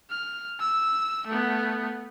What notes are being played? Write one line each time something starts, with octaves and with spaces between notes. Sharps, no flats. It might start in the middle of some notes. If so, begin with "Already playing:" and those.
F6
E6
A3 B3